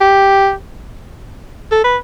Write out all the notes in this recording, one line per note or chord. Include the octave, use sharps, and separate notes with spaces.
G4
A4
B4